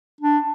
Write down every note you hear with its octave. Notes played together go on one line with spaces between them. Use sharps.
D4